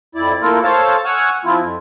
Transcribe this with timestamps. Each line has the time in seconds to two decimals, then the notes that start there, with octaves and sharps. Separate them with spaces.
0.15 F2 E4 D5
0.42 A3 A#3 E4 F4 A4 A#4
0.63 A4 C5 C#5 F5 A5
1.05 F#5 G#5 C#6 E6 F6
1.45 F3 C4 E4 F4
1.60 F2